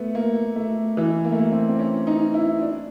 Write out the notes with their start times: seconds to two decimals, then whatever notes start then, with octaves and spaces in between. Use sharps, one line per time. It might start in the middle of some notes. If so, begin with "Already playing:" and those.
Already playing: A3 B3
0.15 A#3
0.56 A3
0.97 E3
1.24 A#3
1.32 A3
1.39 A#3
1.52 C4
1.69 C4
1.79 C#4
2.07 D#4
2.34 E4
2.62 D4